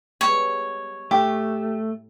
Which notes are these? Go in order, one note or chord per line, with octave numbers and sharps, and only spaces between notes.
G3 G#3 B3 C#5
A2 A3 G4